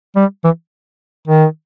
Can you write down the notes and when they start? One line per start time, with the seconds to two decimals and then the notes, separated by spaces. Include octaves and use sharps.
0.16 G3
0.44 E3
1.28 D#3